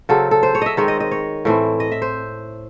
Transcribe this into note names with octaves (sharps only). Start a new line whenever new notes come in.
C#3 F#3 C4 A4
A4
C5
C#5
D#5 E5
D#3 G#3 C4 C#5
D#5
D#5
C#5
A2 E3 A3 C4
D#5
E5
C5